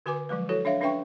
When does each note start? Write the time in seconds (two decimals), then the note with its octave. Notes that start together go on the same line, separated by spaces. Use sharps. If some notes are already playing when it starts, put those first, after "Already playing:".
0.06 D3 F#4 B4 G#5 D6
0.29 F3 F#3 G#3 B4
0.49 E4 F#4 A4 C#5
0.65 D4 C#5 E5 F5
0.81 C#4 D4 B4 E5 G5 C#6